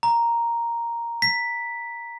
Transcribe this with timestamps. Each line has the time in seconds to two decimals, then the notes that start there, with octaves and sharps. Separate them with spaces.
0.03 A#5
1.22 B6